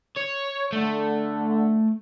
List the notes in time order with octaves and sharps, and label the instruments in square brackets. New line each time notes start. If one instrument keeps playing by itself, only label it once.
[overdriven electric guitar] C#5
[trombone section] D3 [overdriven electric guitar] A3